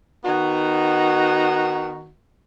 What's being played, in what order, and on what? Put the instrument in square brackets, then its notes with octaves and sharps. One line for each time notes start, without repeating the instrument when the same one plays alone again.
[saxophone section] D#3 B3 D#4 F#4